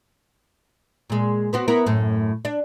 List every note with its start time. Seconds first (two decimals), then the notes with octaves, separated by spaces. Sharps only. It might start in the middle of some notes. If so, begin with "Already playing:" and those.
1.10 A#2 G#3
1.53 B3 C4 F#4
1.68 B3 E4 A#4
1.86 F#2 A2
2.45 D4